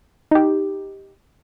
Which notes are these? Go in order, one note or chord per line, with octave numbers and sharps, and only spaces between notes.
D#4 G4